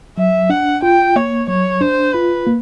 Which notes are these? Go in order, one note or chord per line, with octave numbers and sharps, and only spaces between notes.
F#3 E5
D4 F#5
F4 G5
A#3 C#5
F#3 C#5
D4 C5
F4 B4
A#3